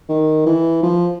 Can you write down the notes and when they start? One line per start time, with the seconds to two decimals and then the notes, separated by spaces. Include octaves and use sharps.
0.09 D#3
0.46 E3
0.83 F3